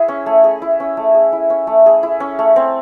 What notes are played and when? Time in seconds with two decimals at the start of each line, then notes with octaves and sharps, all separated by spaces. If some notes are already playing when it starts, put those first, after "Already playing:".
Already playing: E4 G#4
0.08 C#4
0.26 A3
0.44 G#4
0.62 E4
0.80 C#4
0.97 A3
1.14 G#4
1.32 E4
1.50 C#4
1.67 A3
1.86 G#4
2.03 E4
2.20 C#4
2.39 A3
2.56 C4